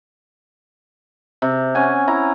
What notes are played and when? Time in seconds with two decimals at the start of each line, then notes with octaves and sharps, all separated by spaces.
1.42 C3
1.75 C#4 F#5 G#5
2.08 E4 A#5